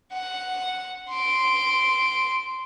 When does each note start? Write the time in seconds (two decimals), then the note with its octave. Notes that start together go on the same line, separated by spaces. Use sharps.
0.13 F#5
1.11 C6 D7